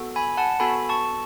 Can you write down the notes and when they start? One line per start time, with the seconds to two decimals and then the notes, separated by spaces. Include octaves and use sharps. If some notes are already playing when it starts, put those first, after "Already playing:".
Already playing: B3 F#4 A4
0.16 G#5 B5
0.37 F#5 A5
0.60 B3 F#4 A4 G#5 B5
0.89 A5 C#6